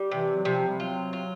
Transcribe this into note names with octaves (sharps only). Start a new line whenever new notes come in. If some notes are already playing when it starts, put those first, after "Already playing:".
Already playing: G3
C3 E3
F#3
C3 F3
G3
F#3 F4
F4